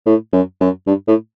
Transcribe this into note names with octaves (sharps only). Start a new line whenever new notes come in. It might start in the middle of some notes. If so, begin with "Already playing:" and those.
A2
F#2
F#2
G2
A2